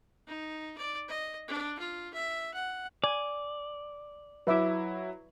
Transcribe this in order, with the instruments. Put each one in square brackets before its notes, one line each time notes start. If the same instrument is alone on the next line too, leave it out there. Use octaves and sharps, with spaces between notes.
[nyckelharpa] D#4
D5
D#5
D4
F4
E5
F#5
[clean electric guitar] D5 [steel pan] G#5
[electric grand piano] F#3 E4 [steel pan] B4 E5 D6